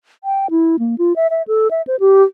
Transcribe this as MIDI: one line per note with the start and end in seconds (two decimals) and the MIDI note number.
0.24 0.47 79
0.51 0.76 64
0.79 0.95 58
0.98 1.13 65
1.16 1.27 76
1.30 1.42 76
1.48 1.68 69
1.71 1.82 76
1.87 1.96 72
2.00 2.23 67